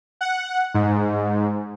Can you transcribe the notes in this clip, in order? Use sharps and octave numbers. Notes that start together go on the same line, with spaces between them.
F#5
G#2